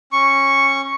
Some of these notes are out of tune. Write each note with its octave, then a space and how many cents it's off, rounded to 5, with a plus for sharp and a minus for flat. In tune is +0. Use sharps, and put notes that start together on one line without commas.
C#4 -25 C#6 +0